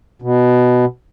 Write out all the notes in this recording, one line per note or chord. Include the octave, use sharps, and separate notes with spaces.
B2